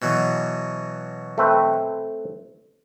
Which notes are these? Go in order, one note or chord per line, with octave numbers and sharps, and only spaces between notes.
B2 E3 F#3
A3 C4 B4